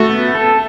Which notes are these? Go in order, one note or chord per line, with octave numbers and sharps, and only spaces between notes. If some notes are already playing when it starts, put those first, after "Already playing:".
Already playing: A3 F#4
B3
A4